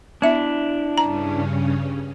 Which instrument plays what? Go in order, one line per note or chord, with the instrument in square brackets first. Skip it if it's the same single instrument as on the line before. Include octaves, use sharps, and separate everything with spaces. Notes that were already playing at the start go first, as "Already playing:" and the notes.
[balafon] B3 E5 [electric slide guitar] D4 E4
[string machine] G2 C#3 C#4 [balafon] A#5